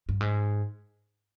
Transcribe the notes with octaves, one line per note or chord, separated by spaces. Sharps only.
G2
G#2